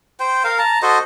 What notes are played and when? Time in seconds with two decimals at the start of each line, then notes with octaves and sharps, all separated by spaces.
0.20 C5 G5
0.44 A#4 F5
0.58 A5 A#5
0.82 F#4 A4 C5 D#5